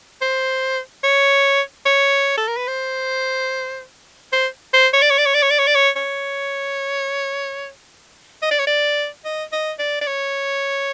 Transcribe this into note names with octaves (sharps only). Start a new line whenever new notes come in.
C5
C#5
C#5
A4
A#4
B4
C5
C5
C5
C#5
D5
C#5
D5
C#5
D5
C#5
D5
C#5
D5
C#5
C#5
D#5
D5
C#5
D5
D#5
D#5
D5
D5
C#5